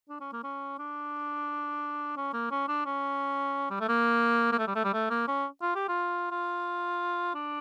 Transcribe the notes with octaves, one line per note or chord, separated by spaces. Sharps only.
D4
C#4
A#3
C#4
D4
C#4
A#3
C#4
D4
C#4
G3
A3
A#3
A#3
A3
G3
A3
G3
A3
A#3
C#4
F4
G4
F4
F4
D4